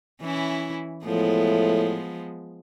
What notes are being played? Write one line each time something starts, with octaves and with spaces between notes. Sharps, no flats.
E3 C#4 E4
A2 F3 G#3 B3